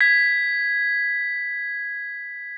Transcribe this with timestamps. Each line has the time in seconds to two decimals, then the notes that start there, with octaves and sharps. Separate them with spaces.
0.01 G#6 B6